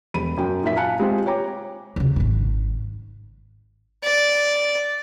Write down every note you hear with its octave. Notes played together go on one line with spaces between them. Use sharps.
E1 B5 D#7
F#2 G5
A#2 F#3 D#4 E5 B6
F5 G#5 A5 F#6 C#7
G#3 C4 F4 G4
C#5 G5 A#5 D6
D#2 C#3
D#1 G#1
D5